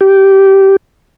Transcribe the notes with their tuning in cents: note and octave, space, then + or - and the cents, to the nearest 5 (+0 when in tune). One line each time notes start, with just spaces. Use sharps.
G4 -15